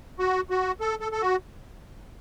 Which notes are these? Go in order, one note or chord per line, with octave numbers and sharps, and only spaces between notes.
F#4
F#4
A4
A4
A4
F#4